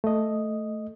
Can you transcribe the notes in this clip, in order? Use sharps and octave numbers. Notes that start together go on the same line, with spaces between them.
A3 D#5